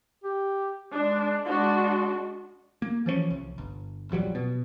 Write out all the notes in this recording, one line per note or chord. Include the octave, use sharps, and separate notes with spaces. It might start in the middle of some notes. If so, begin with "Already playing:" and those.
G4
G#3 D4
G#3 D4 F#4
A#3
E3 F3 A3 C#4
C2
G1
A#1 F2 F#3 G3
B2